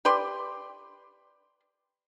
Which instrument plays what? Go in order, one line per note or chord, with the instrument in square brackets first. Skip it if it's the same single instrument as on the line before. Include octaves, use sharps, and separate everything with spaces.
[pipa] G4 B4 D5 C6